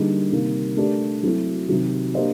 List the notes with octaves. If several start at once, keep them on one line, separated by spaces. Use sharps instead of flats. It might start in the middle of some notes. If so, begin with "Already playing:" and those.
Already playing: D3 G3 A#3 D#4 G#4
C3 D#3 G3 A#3
A3 D4 G4 A#4 D5
F#3 A3 C4 E4 A4
C3 D#3 F#3
A#3 D4 G4 C5 D#5